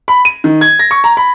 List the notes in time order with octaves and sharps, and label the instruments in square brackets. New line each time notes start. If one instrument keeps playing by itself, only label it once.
[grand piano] B5
D#7
D#3
G#6
A#6
C#6
A#5
B5